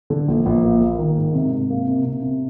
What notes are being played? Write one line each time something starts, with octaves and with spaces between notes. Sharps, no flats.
D3
A#1
A#1
A#3
A#3
D#3
G#2
C3
C3
A#3
C3
C3
C3